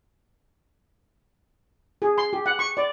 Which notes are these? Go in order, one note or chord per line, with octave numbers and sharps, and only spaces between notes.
G#4
C6
G4
F#5
C#6
D5